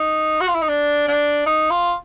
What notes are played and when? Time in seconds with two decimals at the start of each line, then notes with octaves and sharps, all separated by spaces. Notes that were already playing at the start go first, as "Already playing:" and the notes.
Already playing: D#4
0.40 F#4
0.48 F4
0.54 E4
0.62 D#4
0.69 D4
1.08 D4
1.46 D#4
1.70 F4